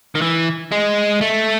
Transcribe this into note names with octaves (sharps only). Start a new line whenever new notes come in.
D#3
E3
G#3
A3